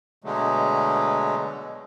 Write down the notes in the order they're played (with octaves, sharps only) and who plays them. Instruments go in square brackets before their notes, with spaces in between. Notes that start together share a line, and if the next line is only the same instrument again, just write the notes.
[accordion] B2 D3 F#3 G#3 A3